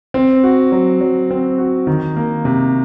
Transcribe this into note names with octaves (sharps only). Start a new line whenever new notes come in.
C4
F#4
F#3
F#3
C4
F#4
D#3
A#3
C3